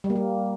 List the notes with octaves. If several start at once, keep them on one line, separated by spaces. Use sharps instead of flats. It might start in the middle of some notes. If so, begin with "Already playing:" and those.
G3
A#3
G3